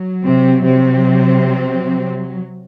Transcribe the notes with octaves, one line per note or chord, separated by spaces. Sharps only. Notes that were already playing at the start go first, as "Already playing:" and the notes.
Already playing: F#3
C3 C4
C3 C4